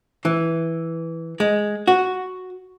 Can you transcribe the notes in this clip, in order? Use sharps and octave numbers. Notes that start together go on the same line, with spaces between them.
E3
G#3
F#4